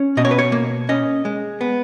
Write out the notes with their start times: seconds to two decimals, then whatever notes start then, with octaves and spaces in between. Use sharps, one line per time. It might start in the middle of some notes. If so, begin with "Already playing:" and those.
Already playing: C#4
0.17 B2 D#5
0.25 C#5
0.31 B4
0.39 C#5
0.52 A#3
0.89 C#4 D#5
1.25 G#3
1.61 B3